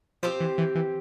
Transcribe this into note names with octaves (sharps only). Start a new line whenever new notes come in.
F3 C4 G4 C5
E3
E3
E3